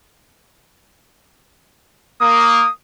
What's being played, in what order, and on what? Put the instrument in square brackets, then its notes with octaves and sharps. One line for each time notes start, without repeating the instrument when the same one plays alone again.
[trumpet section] A#3 [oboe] D#6